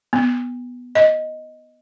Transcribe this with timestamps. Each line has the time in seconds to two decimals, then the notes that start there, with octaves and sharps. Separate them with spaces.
0.13 B3
0.95 D#5